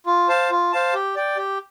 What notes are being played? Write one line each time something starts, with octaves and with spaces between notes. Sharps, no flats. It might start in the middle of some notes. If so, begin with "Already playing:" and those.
F4
C5 F5 A5
F4
C5 F5 A5
G4
D5 G5
G4